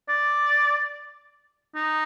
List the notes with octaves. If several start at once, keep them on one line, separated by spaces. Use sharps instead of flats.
D5
D#4